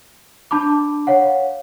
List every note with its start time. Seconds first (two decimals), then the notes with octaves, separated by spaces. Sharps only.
0.51 D4 A5 B5 D6
1.07 C#5 F5 F#5